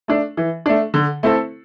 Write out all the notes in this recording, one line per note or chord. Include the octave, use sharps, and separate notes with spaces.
A3 D4
E3
A3 D4
D3
A3 C4 E4 A4